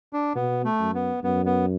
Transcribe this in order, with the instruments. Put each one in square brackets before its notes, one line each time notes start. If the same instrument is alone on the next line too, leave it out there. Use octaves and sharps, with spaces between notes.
[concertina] D4
[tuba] B2 [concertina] B3
[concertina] A3
[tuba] F#2
[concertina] B3
[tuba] F#2 [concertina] B3
[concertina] B3